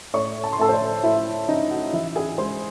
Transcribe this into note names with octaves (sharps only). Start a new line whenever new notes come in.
A2 C#5 C#6
A5
C6
A2 A4 A5
C5
C#5
A2 E4 E5
C#4 D#4 D#5
F#4 F#5
E3 E4 E5
G#4 G#5
G#3 C5 C6